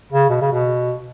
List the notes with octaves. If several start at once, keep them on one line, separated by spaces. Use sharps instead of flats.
C#3
B2
C#3
B2